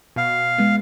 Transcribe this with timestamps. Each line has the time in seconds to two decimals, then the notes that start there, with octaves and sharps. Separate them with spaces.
0.16 B2 F5
0.58 G#3 B3